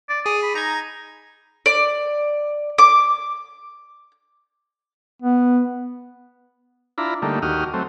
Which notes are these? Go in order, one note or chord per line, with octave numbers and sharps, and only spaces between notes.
D5
G#4 D#6
B5
D#4 A#5 G#6
D5
D6
B3
D4 E4 F4 A#5 B5
D3 G3 A3 A#3 D#4
D#2 F#4 G4 D#6 F6
F#3 A3 C4